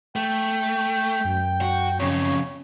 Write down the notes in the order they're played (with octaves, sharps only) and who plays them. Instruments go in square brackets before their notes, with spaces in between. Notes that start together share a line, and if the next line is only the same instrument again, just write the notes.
[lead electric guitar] A3 [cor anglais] G5
[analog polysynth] F#2
[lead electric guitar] F#4
[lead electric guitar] F2 C#3 [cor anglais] C#5